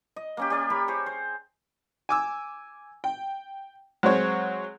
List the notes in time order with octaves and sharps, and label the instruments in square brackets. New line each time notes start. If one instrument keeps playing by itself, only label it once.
[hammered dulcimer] D#5
A#3 C#4 G4
G4 D5
A#4 C#5 B5
G#4 C5 C#5
C5
[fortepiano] G#5 D6 E6
G5
F#3 G#3 C4 C#5